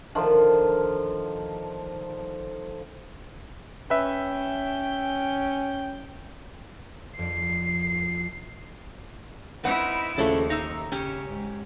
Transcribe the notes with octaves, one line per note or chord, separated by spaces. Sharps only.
D3 D#3 F3
C#4 B4 E5 G5
F2 D5 C7
C4 D#4 E4 B4 F#5
D#2 C#3 F3 A3 D4 E4 A4
D#4 E5 A#5
C#3 C#4 G4
G#2